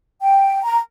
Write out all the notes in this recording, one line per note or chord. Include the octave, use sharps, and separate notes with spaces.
G5
A#5